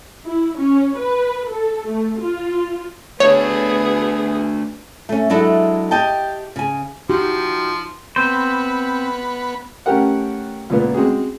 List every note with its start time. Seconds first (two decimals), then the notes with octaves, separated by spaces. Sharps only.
0.24 E4
0.57 C#4
0.97 B4
1.47 A4
1.86 A3
2.20 F4
3.20 A3 B3 D4 G#4 C#5
5.09 A3 C#4
5.30 F#3 G#3 D4 E4 A4
5.91 G4 D#5 G5 A5
6.56 C#3 G#5
7.09 F3 D#4 F#4 G4
8.16 B3 C4 C5
9.86 A3 C#4 G4 A#4 F#5
10.70 C#2 A#2 B3
10.94 G#3 C4 F#4 G#4